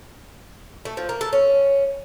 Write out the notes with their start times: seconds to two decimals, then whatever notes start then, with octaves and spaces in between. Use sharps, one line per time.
0.85 A3
0.97 F3
1.09 A#3
1.21 A4
1.33 C#4